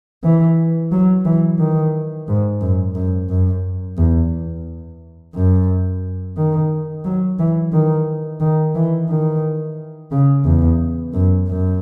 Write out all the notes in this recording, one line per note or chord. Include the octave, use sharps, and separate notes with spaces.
E3
F#3
E3
D#3
G#2
F#2
F#2
F#2
E2
F#2
D#3
F#3
E3
D#3
D#3
E3
D#3
C#3
E2
F#2
F#2